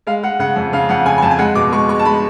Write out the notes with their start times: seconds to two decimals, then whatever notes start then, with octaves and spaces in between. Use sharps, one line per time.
0.07 G#3 F5
0.23 G#3 F#5
0.39 C#3 F#5
0.56 F2
0.73 C#3 F5
0.89 F2 F#5
1.05 C#3 G#5
1.18 G#5
1.22 F2 A5
1.31 G#5
1.38 G#3 F#5
1.55 B2 D6
1.72 G#3 C#6
1.88 G#3 C#6
1.99 A5
2.05 G#3 B5